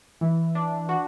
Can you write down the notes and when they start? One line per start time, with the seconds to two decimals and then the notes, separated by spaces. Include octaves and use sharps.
0.21 E3
0.55 D4
0.89 F#4